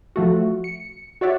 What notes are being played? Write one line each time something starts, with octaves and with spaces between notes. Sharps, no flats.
F3 A3 F#4
C#7
F#4 C#5 D5 E5 F#5